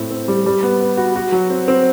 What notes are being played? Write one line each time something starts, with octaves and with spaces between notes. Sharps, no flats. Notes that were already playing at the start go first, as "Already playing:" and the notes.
Already playing: A2 C4
C4
G3
G3
B3
B3
F#4
F#4
F#3
C4
C4